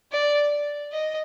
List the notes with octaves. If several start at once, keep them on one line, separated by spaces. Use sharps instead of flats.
D5
D#5